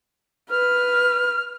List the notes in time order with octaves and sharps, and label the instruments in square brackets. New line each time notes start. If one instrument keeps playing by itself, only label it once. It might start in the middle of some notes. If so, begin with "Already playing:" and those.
[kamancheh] B4 [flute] F6